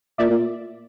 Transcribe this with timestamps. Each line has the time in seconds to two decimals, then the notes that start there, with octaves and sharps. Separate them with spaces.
0.18 A#2 D5 E5
0.30 A#2